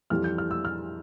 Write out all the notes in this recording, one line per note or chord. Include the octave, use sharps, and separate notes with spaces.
F2 E3 G3 F6
G6
F6
E6
F6